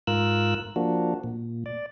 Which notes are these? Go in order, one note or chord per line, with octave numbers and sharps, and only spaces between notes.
G#2 F4 A#4 E6 F#6
F3 A#3 D4 F#4
A#2
D5